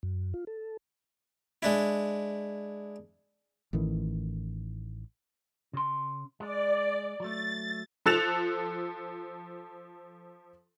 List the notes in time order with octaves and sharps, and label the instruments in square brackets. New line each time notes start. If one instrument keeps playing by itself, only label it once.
[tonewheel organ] F#2
F4
A4
[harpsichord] G#3 D4 E4
[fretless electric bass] A1 A2 D#3 E3
[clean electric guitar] C#3 C6
[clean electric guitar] G#3 [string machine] D5
[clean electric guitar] F#3 A3 [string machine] A6
[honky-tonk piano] F3 A4 F#6 A6 E7 F7